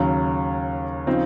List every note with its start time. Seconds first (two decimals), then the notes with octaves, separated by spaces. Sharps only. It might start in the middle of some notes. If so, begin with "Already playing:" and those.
Already playing: D#2 C#3 F#3
1.07 C#3 F3 C4 D#4